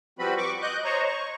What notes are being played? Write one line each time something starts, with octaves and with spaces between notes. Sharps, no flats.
F3 G3 C4 F#4 B4 B5
C#6 D6
D#5 F#6 G6
C5 C#5 D#5 A#5 C#6
C#6